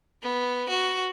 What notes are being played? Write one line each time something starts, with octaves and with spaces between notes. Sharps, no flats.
B3
F#4